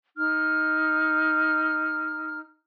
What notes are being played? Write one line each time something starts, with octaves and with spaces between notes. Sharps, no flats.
D#4 F6